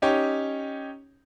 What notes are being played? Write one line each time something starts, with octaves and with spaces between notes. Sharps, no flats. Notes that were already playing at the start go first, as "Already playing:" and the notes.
C#4 D#4 G4 C#5